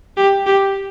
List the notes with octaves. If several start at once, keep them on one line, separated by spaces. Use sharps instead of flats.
G4
G4